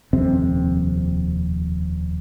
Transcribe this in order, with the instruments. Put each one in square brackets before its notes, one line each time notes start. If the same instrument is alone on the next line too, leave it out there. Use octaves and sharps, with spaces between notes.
[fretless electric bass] D#1 F2 C3 C4